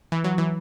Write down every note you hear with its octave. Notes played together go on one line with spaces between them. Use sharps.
E3
F#3
E3